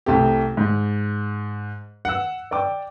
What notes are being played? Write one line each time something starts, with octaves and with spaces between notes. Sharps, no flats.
C2 C3 A3 G4
G#2
F#5 E6
D5 G5 D6